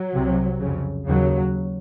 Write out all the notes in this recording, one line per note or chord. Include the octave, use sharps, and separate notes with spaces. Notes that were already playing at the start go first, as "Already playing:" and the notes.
Already playing: F#3
C2 C3
F2 C#3
D#2 C#3 F#3